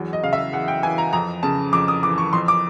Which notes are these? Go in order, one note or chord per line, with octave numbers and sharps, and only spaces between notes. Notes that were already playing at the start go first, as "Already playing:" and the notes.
Already playing: E2 F#3
D#5
C#3 F5
E5
E2 F#5
G5
E3 G#5
A#5
F2 A#5
C#3 A5
F2 D6
D#6
E3 D6
C#6
F2 C6
D6